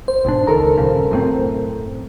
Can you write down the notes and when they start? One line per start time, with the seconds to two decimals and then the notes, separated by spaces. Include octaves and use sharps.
0.08 C5
0.25 B1 G#2 D4
0.47 C#2 D#3 A4 A#4 A#5
0.77 D#1 C2 C#3
1.11 F#2 A2 C4